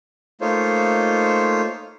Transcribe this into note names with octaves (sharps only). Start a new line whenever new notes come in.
A3 A#3 D#4 F4 C5 C#5